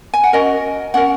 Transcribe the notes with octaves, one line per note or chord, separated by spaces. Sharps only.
G#5
F#5
C#4 F#4 A#4 D#5
C#4 A#4 F#5